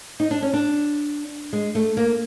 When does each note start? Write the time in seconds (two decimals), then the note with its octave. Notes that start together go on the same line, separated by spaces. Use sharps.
0.20 D#4
0.31 D4
0.42 C#4
0.53 D4
1.53 G#3
1.75 A3
1.97 A#3